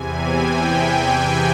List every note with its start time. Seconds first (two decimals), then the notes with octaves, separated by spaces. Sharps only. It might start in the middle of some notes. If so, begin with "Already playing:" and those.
Already playing: E2 C3 E3 G#5
0.25 G5
1.24 G#5